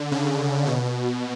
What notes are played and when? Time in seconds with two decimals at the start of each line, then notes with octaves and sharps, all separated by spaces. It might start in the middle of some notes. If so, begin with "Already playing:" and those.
Already playing: D3
0.12 C#3
0.66 B2